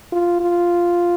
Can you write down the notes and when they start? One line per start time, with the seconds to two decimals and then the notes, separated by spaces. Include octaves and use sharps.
0.13 F4
0.41 F4